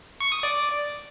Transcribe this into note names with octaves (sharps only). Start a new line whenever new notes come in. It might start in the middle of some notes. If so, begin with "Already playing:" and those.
C#6
D#6
D5